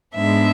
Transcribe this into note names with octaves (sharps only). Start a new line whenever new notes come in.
G#2 G#3 B3 D4 E5